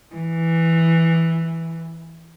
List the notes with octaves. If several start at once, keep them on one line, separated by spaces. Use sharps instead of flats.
E3